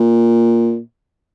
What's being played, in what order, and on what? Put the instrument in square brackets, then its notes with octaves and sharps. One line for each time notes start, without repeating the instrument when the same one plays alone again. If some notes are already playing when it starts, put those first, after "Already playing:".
Already playing: [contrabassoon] A#2